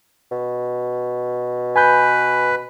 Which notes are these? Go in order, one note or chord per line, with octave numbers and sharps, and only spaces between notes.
B2
B4 G#5 B5 G6